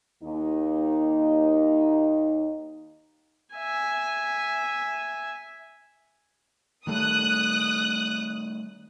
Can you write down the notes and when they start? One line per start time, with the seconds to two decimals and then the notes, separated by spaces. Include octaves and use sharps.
0.23 D#2 D#4
3.55 E5 G#5
6.87 D#3 G3 A3 D#6 F#6